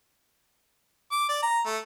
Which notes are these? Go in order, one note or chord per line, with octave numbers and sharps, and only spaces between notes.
D6
D5
A#5
A3